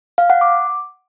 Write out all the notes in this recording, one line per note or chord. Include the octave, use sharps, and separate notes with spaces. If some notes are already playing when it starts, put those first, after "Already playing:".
F5
F#5
D6